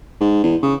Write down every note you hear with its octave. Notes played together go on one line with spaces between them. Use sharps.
G#2
E2
C#3